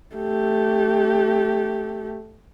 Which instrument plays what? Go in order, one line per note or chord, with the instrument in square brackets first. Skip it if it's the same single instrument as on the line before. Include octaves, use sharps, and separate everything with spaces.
[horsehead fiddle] A3 G4